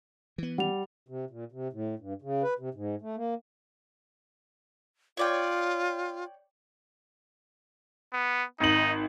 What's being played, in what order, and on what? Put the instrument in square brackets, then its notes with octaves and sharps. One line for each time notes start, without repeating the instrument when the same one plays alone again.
[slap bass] E3 B3
[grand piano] G3 [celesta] F#5 F7
[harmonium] C3
A#2
C3
A2
G2
C#3
B4
C3
G#2
A3
A#3
[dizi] F4 [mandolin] C#5 D5 G5
[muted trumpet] B3
[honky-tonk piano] G#1 F#7 [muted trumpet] D#4